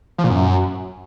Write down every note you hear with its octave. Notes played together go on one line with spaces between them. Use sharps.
F3
A#2
F#2